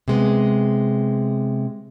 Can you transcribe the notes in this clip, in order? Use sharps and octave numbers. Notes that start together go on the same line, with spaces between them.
C3 G#3 B3